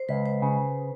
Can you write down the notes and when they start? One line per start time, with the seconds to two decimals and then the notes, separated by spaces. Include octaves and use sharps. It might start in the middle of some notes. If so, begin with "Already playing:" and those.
Already playing: C5
0.09 C#2 B4
0.26 C5
0.42 C#3